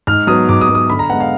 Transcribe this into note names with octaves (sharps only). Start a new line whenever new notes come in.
G#2 F6
F#3 B3 D#6
G#2 D6
D#6
F#3 B3
D#6
D3 B5
A#5
G#3 B3 F#5
F5